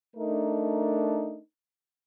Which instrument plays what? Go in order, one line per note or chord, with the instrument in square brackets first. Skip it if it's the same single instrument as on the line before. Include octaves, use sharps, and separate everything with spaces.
[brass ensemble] A3 D4 D#4 A#4